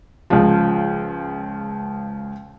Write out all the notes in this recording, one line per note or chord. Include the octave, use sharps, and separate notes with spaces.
C#2 C#3 F3